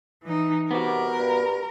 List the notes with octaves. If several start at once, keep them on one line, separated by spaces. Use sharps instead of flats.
E3 D#4
C3 B3 F#4 A#4 D6
G2